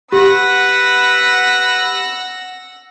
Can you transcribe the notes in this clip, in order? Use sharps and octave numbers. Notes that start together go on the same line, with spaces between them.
G4 B4 F#5 E6 A#6